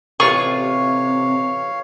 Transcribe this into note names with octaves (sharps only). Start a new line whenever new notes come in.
A1 C3 F4 G#4 C#5 F5 C#6